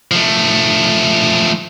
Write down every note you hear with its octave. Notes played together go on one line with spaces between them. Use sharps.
F3 A3